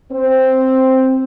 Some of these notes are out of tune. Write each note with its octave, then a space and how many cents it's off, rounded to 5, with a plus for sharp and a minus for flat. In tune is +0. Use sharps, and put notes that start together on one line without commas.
C4 +0 C5 +0